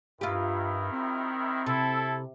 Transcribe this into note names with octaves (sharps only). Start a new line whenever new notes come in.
G2 D#3 E4 F4 G4
C4
C3 E4 A4